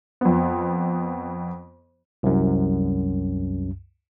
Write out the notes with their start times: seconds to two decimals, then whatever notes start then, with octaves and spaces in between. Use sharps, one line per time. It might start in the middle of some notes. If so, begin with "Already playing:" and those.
0.21 F2 B3
2.23 C2 F#2